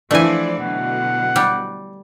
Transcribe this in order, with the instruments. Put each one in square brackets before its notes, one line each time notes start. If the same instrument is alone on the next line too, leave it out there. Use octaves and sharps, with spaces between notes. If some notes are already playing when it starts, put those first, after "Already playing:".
[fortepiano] E3 D4 [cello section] F3 C5 D5 [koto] A3 G#5
[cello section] B2 D3 F#3 [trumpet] F#5
[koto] G3